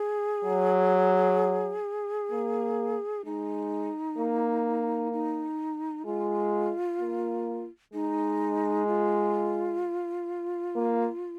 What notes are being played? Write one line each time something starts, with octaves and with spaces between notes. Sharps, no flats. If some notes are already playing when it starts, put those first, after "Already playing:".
Already playing: G#4
F#3
A#3
G#3 D#4
A#3
D#4
G#3 F4
A#3
G#3 D#4
F4
A#3